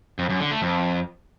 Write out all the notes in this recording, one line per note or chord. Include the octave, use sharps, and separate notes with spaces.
F2
F#2
D3
A3
F2